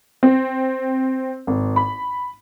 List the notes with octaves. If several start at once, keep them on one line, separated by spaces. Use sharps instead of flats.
C4
G#1
B5